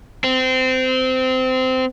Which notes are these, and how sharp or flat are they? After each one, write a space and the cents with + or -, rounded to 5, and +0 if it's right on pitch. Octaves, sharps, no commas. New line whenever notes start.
C4 -20